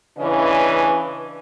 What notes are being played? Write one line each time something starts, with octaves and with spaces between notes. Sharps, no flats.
C#3 E3 C#4 D4 B4 D#5